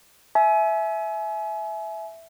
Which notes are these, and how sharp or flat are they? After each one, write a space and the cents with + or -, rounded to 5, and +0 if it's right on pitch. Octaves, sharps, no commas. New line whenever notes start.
E5 +0 G#5 +35